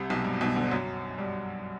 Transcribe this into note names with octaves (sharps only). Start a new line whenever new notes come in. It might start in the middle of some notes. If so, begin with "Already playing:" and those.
Already playing: C2 C3
B1 B2
G2
B1 B2
D2 D3
F#2 F#3
G2 G3